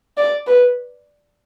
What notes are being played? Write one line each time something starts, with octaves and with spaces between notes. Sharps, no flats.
D5
B4